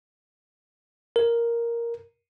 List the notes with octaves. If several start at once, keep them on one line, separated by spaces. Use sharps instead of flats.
A#4